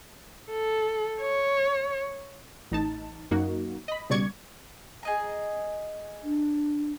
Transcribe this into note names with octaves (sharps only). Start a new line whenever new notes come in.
A4
C#5
A1 D#4 A5
F#2 A#3 D#4 F#4
D#5 B5
C#2 B2 G3 D5 C#6 G#6
G#4 D#5 A#5
D4